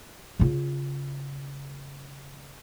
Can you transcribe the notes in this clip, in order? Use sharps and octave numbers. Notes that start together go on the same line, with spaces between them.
C#3 F4